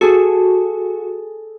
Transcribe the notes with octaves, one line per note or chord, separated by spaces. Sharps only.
F#4 G#4 A4